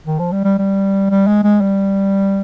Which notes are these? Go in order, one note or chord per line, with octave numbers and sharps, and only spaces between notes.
D#3
F3
G3
G3
G3
G3
G#3
G#3
G3